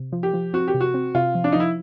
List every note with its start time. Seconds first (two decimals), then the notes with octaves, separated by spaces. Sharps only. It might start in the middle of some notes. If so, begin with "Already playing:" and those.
Already playing: C3
0.12 F3
0.23 G4
0.34 F3
0.54 C4 F#4
0.68 G4
0.74 C3
0.81 F#4
0.94 C4
1.15 C3 F4
1.35 F3
1.44 D4
1.52 D#4
1.56 F3 E4